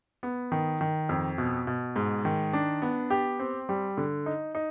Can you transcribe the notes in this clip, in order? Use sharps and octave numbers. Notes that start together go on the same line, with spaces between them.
B3
D#3
D#3
F2
B2
B2
G#2
D#3
D4
B3
G4
C4
G3
D3
D#4
D#4